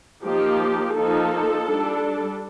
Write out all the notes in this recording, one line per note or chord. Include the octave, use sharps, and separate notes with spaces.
F3 A#3 D#4 G4
F3 A#3 D#4 A4
G3 D4